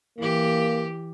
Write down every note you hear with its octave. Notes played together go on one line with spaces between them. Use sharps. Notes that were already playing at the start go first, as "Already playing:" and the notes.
E3 A#3 G4